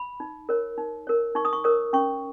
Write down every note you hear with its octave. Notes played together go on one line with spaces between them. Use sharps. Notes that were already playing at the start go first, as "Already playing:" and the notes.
Already playing: B5
D#4
A#4 C#5
D#4
A#4 C#5
D#4 C#6
D#6
C#6
A#4 C#5 D#6
C#4 C#6